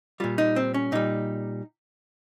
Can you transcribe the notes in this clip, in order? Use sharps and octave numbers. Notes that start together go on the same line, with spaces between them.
A#2 G3 F4
D#4
C4
C#4
A#2 G3 D#4